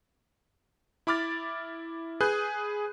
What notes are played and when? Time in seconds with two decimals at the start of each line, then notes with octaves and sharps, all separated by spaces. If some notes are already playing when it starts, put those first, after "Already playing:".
1.07 E4 B5 D6 F6 A6
2.21 G#4 B4 F#6 G6